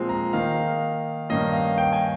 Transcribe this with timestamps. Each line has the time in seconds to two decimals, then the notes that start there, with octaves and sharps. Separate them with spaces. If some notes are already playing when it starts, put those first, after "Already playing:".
Already playing: A#2 F3 G#3 C4
0.09 A#5
0.33 D#3 A#3 D#4 F5
1.29 G2 D#3 A#3 C#4 D#5
1.53 F5
1.78 G5
1.93 G#5